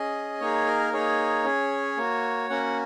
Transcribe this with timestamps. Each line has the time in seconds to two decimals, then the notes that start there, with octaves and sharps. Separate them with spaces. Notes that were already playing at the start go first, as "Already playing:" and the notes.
Already playing: C#4 G#4 D#5
0.40 A#3 D#4 G#4 C#5
0.66 A#4
0.93 A#3 D#4 G#4 C#5
1.45 C#4 G#4
1.98 A#3 F#4
2.50 A#3 C#4 F#4 F#5